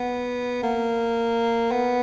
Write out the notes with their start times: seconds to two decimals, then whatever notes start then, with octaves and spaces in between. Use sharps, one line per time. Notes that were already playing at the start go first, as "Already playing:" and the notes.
Already playing: B3
0.63 A#3
1.71 B3